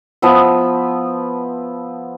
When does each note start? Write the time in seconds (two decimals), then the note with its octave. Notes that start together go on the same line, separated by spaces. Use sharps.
0.22 F3 B3 E5